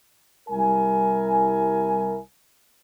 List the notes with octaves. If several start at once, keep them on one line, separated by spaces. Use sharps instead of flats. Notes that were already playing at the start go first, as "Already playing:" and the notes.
C2 G3 E4 A#4 G#5